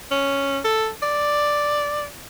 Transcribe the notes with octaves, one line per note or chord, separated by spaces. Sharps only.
C#4
A4
D5